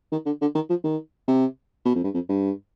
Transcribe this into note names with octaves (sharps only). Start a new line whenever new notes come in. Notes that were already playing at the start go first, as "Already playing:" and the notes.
D#3
D3
D3
D#3
F3
D#3
C3
B2
F2
G2
F2
G2